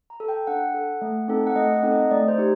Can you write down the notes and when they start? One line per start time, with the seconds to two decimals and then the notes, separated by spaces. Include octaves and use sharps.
0.10 A#5
0.20 A4
0.28 G5
0.47 D4 F#5
0.74 A4
1.02 A3
1.28 C4 D#4 A4
1.47 F#5
1.56 A3 D#5
1.74 F#5
1.83 C4 D#4 A4
1.92 D#5
2.11 A3 D5
2.28 C5
2.38 D#4 G4